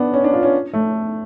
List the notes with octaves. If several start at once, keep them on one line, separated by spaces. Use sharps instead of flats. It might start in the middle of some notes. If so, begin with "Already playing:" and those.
Already playing: B3 D4
C#4
D4
F4
C#4
A3